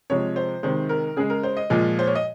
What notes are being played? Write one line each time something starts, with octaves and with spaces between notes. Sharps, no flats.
C3 F3 G#3 C#5
C5
C3 D#3 G#3 C5
A#4
C#3 G#3 G#4
A#4
C5
D#5
A#2 F3 G#3
C5
C#5
D#5